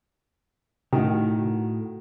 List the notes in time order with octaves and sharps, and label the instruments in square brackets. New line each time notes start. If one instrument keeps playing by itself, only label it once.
[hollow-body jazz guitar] A2 A3 F#4 [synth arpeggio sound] C3 [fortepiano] D#3